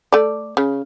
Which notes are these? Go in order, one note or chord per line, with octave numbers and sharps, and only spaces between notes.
A3 D5
C#3